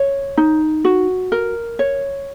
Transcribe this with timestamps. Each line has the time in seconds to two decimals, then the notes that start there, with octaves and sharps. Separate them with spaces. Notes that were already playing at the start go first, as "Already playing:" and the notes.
Already playing: C#5
0.37 D#4
0.85 F#4
1.32 A#4
1.79 C#5